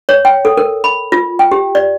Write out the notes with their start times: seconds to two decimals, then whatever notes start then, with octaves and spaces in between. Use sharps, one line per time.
0.09 C#5
0.25 G5
0.45 A4
0.57 A#4
0.84 B5
1.12 F4
1.39 G5
1.51 G4
1.75 D5